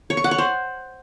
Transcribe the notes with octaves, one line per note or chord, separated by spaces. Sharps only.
C#5
C#6
F#5
C#5
C5